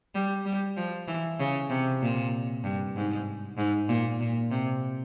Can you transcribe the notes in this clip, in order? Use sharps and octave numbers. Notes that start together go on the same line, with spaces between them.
G3
G3
F3
E3
C#3
C3
A#2
G2
G#2
G#2
A#2
A#2
C3